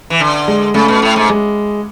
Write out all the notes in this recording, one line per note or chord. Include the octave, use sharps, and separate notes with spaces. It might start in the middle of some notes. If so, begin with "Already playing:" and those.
E3
D3
G#3
C#3 A3
B2
A2
G#2
G#3